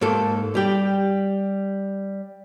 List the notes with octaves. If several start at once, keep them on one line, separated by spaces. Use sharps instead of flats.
G#2 A#3 A4
G3 G4